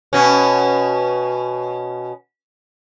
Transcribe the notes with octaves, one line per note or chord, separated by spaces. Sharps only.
B2 C#4